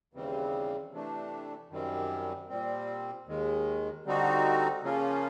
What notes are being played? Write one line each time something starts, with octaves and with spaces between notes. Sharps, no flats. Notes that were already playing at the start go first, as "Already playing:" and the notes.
D#2 C#3 E3 G3 C4
C3 E3 A3 D4
F#2 D#3 G3 C4
A#2 G3 C4
D#2 D#3 G#3
D3 G3 C4 D#4 F#4
C#3 F3 A#3 C#4 F4